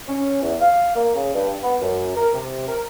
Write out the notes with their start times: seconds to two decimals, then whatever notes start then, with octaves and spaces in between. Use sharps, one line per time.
0.08 C#4
0.42 E2
0.61 F5
0.96 A#3
1.15 C#3
1.34 G2
1.63 B3
1.81 F#2
2.16 A#4
2.33 C3
2.68 A#4